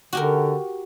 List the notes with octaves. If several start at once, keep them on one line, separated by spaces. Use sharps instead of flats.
D3 F#4 G4 A#4